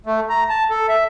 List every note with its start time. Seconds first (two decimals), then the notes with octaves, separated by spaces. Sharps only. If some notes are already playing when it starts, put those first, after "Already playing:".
0.06 A3
0.29 A#5
0.49 A5
0.70 A4
0.89 E5